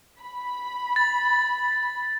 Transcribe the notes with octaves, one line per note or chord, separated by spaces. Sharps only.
B5
A6